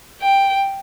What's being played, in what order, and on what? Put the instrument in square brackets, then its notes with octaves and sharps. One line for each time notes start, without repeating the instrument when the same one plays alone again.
[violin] G5